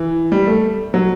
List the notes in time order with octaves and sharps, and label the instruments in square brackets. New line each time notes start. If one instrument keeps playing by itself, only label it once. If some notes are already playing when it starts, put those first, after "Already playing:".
Already playing: [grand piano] E3
G3
A3
F#3